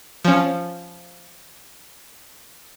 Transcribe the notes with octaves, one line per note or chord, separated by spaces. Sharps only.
F3 C#4